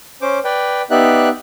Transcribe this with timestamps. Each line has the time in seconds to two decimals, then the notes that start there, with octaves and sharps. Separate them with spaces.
0.22 C#4 C5 D6
0.44 B4 D5 G5
0.91 B3 D#4 G4 D5 E5 F#6